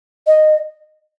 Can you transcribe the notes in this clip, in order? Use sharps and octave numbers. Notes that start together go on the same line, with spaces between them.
D#5